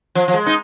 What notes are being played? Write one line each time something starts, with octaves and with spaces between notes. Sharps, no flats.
F3
F3
G#3
D#4